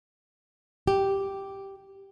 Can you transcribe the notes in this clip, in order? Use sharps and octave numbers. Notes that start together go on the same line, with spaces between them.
G4